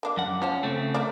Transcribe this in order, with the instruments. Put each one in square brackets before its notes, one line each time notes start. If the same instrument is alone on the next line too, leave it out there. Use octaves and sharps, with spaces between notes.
[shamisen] A#3 D4 G4
[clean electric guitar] F#2 F#5
[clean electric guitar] C#4 [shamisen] F4 C5 A5
[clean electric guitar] C#3 A3 C4
[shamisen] A#3 A#4 D5